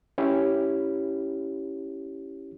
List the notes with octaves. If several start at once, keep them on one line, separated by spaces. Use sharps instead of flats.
C#4 E4 G4